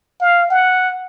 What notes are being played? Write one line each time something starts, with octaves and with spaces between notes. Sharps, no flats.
F5
F#5